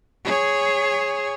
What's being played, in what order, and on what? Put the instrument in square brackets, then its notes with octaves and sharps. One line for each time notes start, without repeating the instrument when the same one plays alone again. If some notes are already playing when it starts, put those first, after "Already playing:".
[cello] G#4 C#5